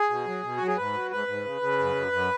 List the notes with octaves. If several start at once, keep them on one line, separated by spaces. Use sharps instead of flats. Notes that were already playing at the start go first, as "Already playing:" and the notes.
Already playing: G#4
B2
F#3
B2
F#3 F#4
G#4
G#2 B4
F#3
G#2 B4
G#2
C#3
C#3
F#2
F#2
F#2